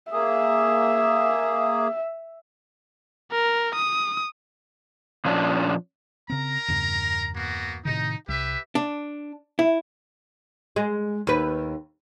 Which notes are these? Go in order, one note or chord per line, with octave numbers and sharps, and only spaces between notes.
A#3 G#4 E5
A#4
D#6
A#2 F3 C#4 D4
C#3 C4 A#4 A#5
E2 G2 C#3
A#3 B3 F#4
A2 C3 D#3 D#4
C2 G4 B4 E5
D4
E4
G#3
D#2 B4